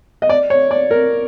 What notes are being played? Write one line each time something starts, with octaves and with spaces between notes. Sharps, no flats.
D#5
D5
C#5
D5
A#4